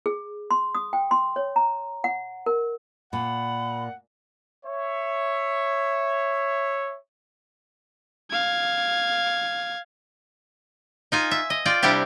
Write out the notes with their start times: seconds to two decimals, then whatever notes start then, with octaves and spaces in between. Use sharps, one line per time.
0.06 G#4
0.51 C6
0.75 D#6
0.93 G5
1.11 C6
1.36 C#5
1.56 A#5
2.04 F#5
2.46 A#4
3.13 A#2 F#5 B5
4.66 C#5 E5
8.31 F5 G#6
11.12 D#4 F4 G#5
11.31 E5
11.50 D#5
11.66 F4 D5 G5
11.83 C3 G3 D4 E4 G4